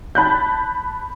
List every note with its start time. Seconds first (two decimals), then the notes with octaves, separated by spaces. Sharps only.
0.15 A5 B5 F#6 G6